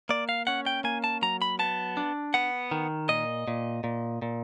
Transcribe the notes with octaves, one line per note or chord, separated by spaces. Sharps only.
A#3 D5
F5
C#4 F#5
G5
A#3 G#5
A5
F#3 A#5
B5
B3 A5
D4
B3 F#5
D#3
A#2 D#5
A#2
A#2
A#2